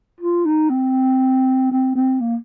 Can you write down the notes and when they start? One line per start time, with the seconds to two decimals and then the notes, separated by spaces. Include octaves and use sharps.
0.20 F4
0.46 D#4
0.70 C4
1.71 C4
1.95 C4
2.20 A#3